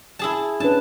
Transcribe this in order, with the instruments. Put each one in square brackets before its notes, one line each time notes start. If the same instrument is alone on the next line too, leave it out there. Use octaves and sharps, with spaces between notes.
[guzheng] E4 G#4 A5
[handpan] C#4 D4 B4 [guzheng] A5